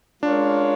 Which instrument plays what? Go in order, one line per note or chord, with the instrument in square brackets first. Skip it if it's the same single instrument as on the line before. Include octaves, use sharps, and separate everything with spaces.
[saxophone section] G#3 C#4 F4 A#4 C#5 [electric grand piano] D4